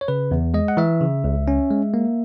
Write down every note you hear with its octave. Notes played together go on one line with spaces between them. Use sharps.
C#5
C#3 B4
E2
G#3 D#5
F#5
E3 E5
C#3
C#2
C#4
G#3
A#3